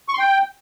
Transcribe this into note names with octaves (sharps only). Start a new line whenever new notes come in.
C#6
C6
G5